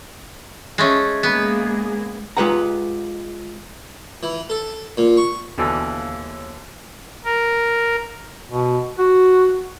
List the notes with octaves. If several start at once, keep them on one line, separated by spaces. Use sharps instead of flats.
G#3 A3 C#4
G#3 A#3 B3 G#4
G#3 F4 G4 B4 F#5 A#5
E3
A4
A#2
C#6
D#2 B2 D3 E3
A#4
B2
F#4